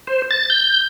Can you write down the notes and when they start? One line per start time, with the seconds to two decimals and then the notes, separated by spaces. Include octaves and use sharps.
0.07 C5
0.31 A6
0.50 G6